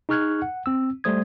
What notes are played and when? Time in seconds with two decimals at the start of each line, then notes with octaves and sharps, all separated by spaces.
0.09 D#4 G#4 C#6 F6 F#6 G#6
0.42 F#5
0.66 C4 E6
1.04 G3 A3 C5 D#6 G#6